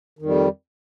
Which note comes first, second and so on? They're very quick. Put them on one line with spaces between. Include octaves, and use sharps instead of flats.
D#3 F2 G3